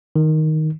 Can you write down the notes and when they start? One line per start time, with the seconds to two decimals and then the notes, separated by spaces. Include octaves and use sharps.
0.16 D#3